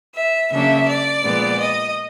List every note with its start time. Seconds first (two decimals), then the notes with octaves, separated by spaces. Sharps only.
0.16 E5
0.52 C#3 F#3 A#3 D4 E5
0.89 D5
1.24 A#2 F3 G#3 B3
1.60 D#5